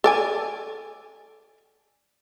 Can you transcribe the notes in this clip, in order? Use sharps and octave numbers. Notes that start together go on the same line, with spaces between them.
A4 D5 G#5